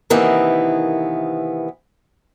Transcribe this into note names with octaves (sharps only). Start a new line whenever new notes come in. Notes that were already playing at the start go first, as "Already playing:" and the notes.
C3 D#3 E3 A#3 B3